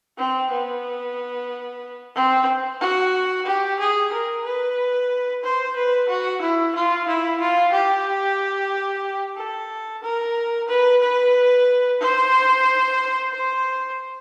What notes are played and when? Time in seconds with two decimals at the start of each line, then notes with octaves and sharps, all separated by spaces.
0.18 C4
0.50 B3
2.15 C4
2.80 F#4
3.46 G4
3.79 G#4
4.12 A#4
4.45 B4
5.43 C5
5.76 B4
6.08 F#4
6.41 E4
6.75 F4
7.08 E4
7.40 F4
7.73 G4
9.37 A4
10.03 A#4
10.68 B4
11.01 B4
12.00 C5
13.32 C5